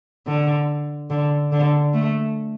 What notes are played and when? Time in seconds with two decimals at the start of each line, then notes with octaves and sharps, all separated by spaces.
0.27 D3
1.10 D3
1.52 D3
1.94 A3